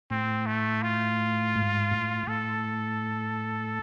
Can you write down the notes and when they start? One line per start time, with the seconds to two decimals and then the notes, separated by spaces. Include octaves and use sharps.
0.11 A2 C4
0.46 A3
0.83 F4
1.56 G#2
1.91 A2
2.27 A2 A4